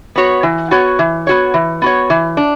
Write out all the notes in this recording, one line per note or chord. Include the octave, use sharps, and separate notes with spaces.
B3 F#4 C#5
E3
B3 F#4 C#5
E3
B3 F#4 C#5
E3
B3 F#4 C#5
E3
D4